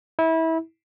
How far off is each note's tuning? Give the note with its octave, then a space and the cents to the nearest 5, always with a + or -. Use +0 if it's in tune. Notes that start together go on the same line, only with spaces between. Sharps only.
E4 -25